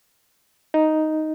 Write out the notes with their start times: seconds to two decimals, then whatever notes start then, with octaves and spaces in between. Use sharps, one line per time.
0.74 D#4